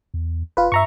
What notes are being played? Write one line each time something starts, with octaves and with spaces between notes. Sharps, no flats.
E2
F1 F4 B4
G2 E5 A#5 C#6